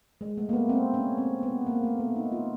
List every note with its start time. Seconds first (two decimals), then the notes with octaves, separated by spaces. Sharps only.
0.21 G#3
0.38 A3
0.49 A#3
0.53 B3
0.69 C4
0.94 C#4
1.18 C4
1.43 B3
1.67 A#3
1.84 A3
1.99 B3
2.16 D#4
2.32 F4